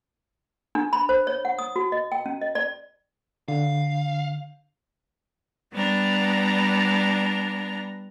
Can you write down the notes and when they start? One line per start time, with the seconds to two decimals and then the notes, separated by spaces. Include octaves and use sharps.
0.75 D4
0.93 B5
1.09 C5
1.27 C#5
1.45 F#5
1.59 D#6
1.76 F#4
1.92 D#5
2.12 G5
2.26 C#4
2.42 D#5
2.55 D5
3.48 D3 F5
5.72 G3 B3 D4 A#5